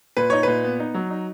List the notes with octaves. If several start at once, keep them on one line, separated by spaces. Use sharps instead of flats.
A#2 B4
D#4 C#5
A#2 B4
B3
D#4
F#3
D#4